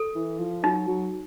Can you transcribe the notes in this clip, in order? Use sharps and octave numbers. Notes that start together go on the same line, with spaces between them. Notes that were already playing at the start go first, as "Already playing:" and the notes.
Already playing: A4
E3
F3
F#3 D#4
F#3